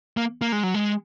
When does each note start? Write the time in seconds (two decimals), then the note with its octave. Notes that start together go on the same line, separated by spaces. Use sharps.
0.17 A#3
0.42 A#3
0.52 G#3
0.63 F#3
0.74 G#3